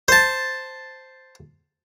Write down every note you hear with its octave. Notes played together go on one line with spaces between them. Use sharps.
C5 A5